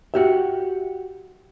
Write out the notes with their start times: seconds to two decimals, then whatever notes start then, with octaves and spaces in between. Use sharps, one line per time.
0.14 F#4 G4 E5